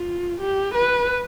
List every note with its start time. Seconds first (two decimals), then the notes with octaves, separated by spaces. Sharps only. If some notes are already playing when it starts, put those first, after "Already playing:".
Already playing: F4
0.41 G4
0.75 B4